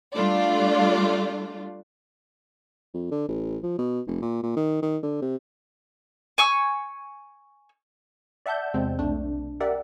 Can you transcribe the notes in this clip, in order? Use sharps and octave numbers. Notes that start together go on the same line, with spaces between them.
G3 A3 D4 F4 D5
F2
D3
A1
F3
B2
F1
A#2
A#2
D#3
D#3
D3
C3
G#5 C#6 E6
D5 E5 F#5 A5 G6
E2 C3 G#3 C4
B1 A3 D4
G4 A#4 D5 E5 F#5